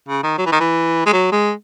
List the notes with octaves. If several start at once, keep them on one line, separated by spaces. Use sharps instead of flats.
C#3
D#3
F#3
E3
D#3
E3
G#3
F#3
G#3